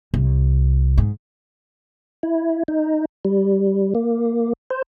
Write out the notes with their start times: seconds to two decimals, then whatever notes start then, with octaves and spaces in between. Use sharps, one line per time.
0.14 C2
0.98 G#2
2.23 E4
2.68 D#4
3.25 G3
3.95 A#3
4.70 C5